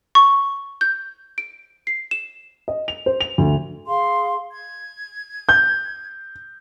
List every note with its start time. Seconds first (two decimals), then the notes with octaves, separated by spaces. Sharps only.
0.15 C#6
0.81 G6
1.38 D7
1.87 C7
2.11 E7
2.68 D#5
2.88 F7
3.06 C5
3.21 F7
3.38 D2
3.87 G#4 F5 C6
4.52 G#6
5.49 G6